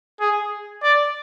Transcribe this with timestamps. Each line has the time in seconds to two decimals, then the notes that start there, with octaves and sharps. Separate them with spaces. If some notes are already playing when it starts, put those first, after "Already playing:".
0.20 G#4
0.83 D5